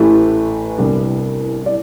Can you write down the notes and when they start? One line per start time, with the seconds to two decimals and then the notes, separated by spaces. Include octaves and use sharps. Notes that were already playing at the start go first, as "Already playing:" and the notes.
Already playing: A1 A2 E3 A3 G4 B4
0.78 C2 C3 G3 B3 D4
1.66 D5